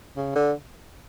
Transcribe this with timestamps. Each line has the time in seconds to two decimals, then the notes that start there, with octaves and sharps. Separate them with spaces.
0.17 C#3
0.35 D3